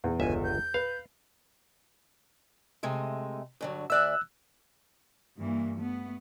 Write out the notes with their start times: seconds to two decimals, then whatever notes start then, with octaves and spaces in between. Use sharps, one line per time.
0.04 E2
0.20 G1 C#2 E5 G#5
0.44 G6
0.74 B4 F5
2.83 C3 G#3 A3
3.61 G2 D3 F#3
3.90 D2 D5 E5 E6 F#6
5.38 G2 E3 A#3
5.76 A3 B3